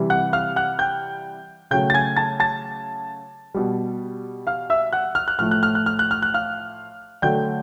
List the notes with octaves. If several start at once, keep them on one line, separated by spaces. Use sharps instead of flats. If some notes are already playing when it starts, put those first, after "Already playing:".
Already playing: C3 E3 G3
F#5 F#6
F5 F6
F#5 F#6
G5 G6
C#3 F#3 A3 G5 G6
A6
G#5 G#6
A5 A6
A5 A6
B2 G3
F5 F6
E5 E6
F#5 F#6
F6
F#6
A2 F3 A3 F6
F#6
F6
F#6
F6
F#6
F6
F#6
F5 F6
D3 F#3 A3 G5 G6